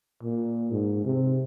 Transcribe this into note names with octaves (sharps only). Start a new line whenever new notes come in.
A#2
G#2
C3